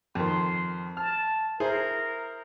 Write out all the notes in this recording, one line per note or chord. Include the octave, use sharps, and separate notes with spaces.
F2 D#3 C6
A5 F6
E4 G#4 A#4 C5